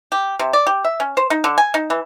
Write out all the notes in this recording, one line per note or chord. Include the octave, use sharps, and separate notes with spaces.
G4
C3
D5
G4
E5
C#4
C5
D#4
D3
G#5
D#4
E3